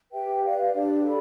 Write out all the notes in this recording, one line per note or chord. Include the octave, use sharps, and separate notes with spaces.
G4 B4 E5 G5
B4 D5 F5
D4 G4 D5
A4 D5 B5